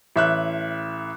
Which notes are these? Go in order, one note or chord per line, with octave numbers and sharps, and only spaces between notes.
A1 E5 F#6